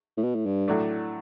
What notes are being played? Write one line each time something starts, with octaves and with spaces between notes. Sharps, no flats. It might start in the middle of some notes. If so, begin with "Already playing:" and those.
A2
B2
A2
G2
A2 F#3 A3 D4